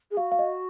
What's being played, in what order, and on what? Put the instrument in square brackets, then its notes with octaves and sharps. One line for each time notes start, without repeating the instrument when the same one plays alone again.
[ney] G#4
[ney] F#4 [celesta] F5
[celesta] F5
D#5